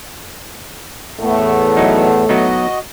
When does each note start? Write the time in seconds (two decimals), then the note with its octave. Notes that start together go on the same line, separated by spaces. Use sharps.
1.20 E2 A2 A3 B3
1.77 F#3 D#4
2.29 F#3 B3 D#4 F#4 D#5